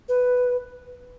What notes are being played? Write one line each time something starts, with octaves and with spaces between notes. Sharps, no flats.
B4